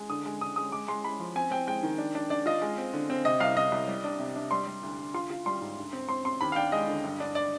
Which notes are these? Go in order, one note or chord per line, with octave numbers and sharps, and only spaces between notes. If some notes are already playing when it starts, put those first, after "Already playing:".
Already playing: G#3
D3 D#6
G#3
D3 D#6
G#3 D#6
G#3 D6
G#3 C6
G#3 B5
F3
C4 G#5
C4 G5
G#3 G5
D#3
D4
D4
D4 D5
F4 D#5
G#3
C4
D3
C4
C3 D#5
C2 F5
C2 D#5
C2
G3
D4
C3
D4
G3 C6
G3
D2
D2
F4 C6
F4
G3 C6
G#2
D2
C4
C4 C6
C4 C6
D#2 B5
F5
D4 G5
G#3 D#5
D3
G2
D4
D5